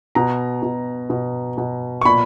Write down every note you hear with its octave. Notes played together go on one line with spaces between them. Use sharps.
B2 A#5
B2
B2
B2
C#6
A#2 B5